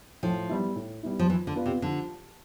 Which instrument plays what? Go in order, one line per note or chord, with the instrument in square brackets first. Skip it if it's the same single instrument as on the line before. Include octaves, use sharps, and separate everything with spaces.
[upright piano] A2 [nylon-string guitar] F3
[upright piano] G3 B3 E4
A2
G3 B3 E4
[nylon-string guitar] F3
[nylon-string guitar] E3 [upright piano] F3
[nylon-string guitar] D3
[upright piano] B3 F4 B4 D5
[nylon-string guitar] C3
[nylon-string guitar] D3 [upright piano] F3